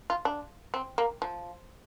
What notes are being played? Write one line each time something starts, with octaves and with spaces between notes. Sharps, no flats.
F4
D4
C4
A#3
F3